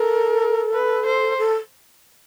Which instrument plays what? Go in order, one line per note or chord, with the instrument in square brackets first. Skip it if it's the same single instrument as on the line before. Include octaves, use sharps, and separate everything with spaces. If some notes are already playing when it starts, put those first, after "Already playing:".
Already playing: [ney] A4 [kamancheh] A#4
[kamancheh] B4
C5
[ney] A4